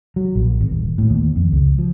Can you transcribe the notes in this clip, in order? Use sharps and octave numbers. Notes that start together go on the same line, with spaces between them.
F#3
A#1
G#1
D#1
A2
D#2
F2
C#2
F3